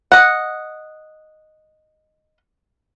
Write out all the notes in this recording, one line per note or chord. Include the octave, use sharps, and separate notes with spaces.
D#5 F#5